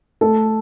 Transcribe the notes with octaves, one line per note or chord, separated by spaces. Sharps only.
A3 A4